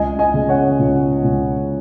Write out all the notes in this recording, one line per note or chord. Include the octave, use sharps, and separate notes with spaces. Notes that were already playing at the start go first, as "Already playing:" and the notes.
Already playing: C#2 D#5 G#5
D#5 G#5
C#3
C#5 F#5
C#2
C#2